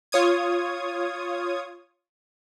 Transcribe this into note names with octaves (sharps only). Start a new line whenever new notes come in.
F4 C#5 D#6 G#6